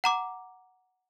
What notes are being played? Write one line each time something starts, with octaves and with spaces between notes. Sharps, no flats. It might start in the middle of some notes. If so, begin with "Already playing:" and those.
F#5 A#5 D6